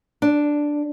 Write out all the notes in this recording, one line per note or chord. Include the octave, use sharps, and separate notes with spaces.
D4